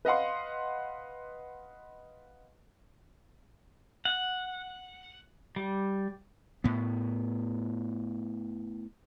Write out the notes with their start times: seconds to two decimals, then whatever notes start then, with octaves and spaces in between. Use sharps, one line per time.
0.05 B4 D#5 F5 F#5 C6
4.05 F#5
5.56 G3
6.64 A2 B3